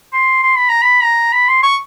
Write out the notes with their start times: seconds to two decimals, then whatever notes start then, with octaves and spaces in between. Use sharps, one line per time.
0.13 C6
0.42 C6
0.56 B5
0.69 A#5
0.82 B5
1.03 A#5
1.32 B5
1.48 C6
1.63 C#6